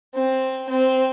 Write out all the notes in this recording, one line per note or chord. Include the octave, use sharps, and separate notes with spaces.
C4
C4